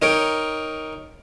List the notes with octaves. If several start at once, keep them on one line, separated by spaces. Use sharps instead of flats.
D#4 A#4 C#5 G5